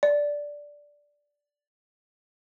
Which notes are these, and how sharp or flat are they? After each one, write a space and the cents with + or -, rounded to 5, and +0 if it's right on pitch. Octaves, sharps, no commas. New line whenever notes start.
D5 -5